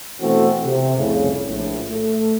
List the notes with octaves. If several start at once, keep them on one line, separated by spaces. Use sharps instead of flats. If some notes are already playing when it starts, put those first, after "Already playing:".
B2 E3 A3 C4 F#4 A4
C3
C2 F2 A2 C#3
A#1 A2
A3